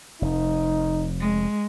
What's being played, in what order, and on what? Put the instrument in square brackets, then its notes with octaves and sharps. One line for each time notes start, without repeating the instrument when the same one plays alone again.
[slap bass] F1 [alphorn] D#4
[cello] G#3